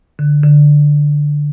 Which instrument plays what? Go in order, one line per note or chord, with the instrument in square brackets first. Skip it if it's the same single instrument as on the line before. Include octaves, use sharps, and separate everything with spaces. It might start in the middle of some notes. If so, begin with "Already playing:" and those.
[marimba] D3
D3